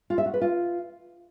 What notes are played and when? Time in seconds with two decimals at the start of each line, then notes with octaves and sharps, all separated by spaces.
0.10 F4
0.18 E5
0.26 F#4
0.34 B4
0.41 F4